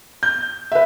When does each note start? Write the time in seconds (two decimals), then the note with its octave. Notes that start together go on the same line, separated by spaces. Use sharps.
0.23 G6
0.72 B4 E5